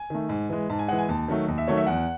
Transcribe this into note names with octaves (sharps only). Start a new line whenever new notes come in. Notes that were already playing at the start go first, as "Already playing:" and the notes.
Already playing: G#5
D#3 A3
G#2
E3 G#3
G#2 A5
G#5
E3 G#3 F#5
G#5
D#2 A5
D#3 F#3 A3
D#2
E5
D#3 F#3 A3 C#5
E5
E2 F#5